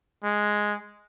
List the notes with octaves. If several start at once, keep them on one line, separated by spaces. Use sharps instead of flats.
G#3